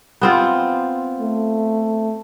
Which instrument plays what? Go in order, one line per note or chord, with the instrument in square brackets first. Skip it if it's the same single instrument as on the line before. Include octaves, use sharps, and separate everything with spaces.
[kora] B3 C4 F4
[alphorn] A3